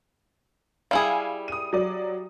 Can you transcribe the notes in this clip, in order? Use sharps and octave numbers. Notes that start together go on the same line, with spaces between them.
G3 E4 G#4 F5 G#5
D#6 D#7
F#3 D5